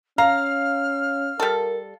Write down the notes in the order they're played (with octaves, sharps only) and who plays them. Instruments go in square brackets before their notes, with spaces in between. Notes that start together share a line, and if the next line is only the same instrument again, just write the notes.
[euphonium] C#4 [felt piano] F5 [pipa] A#5 [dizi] F6
[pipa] G3 A4 [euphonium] A#4